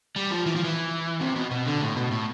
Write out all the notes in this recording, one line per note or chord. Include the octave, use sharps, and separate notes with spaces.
G3
F3
E3
F3
E3
C3
B2
B2
D3
A2
B2
A2